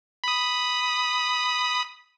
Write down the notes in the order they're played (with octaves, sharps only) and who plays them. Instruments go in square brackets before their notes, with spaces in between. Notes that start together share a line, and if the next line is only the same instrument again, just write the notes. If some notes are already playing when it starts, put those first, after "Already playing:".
[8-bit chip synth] B5 D#6